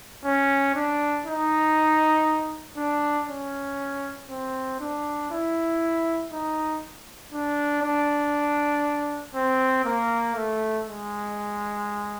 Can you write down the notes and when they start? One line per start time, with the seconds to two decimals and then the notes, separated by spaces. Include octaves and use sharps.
0.25 C#4
0.75 D4
1.26 D#4
2.77 D4
3.28 C#4
4.30 C4
4.80 D4
5.31 E4
6.32 D#4
7.33 D4
7.83 D4
9.35 C4
9.85 A#3
10.35 A3
10.87 G#3